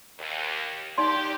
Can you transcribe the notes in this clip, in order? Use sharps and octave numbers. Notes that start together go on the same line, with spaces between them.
D#2
D#2 D#4 G4 D5 C6